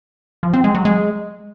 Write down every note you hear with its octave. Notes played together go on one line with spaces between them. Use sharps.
F3
C4
G#3
F#3
G#3